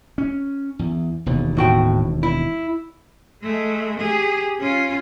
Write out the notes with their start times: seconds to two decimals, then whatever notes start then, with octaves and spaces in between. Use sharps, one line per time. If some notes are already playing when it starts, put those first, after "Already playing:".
0.18 C#4
0.79 E2
1.26 E1 D#2 B2
1.57 A2 F#4 G5
2.23 E4
3.43 G#3 A3
4.00 G4 G#4
4.60 C#4 F4